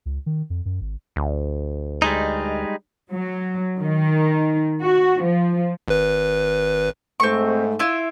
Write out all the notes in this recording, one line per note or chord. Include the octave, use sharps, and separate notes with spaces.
C#2
D#3
F2
F#2
G#1
D2
G3 G#3 D#4
F#3
D#3
F#4
F3
G#1 B4
G#2 A3 C4 C#6
E4 F4 E5